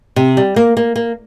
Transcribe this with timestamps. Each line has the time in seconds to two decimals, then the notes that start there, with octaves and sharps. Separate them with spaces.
0.16 C3
0.37 G3
0.56 A#3
0.77 A#3
0.96 A#3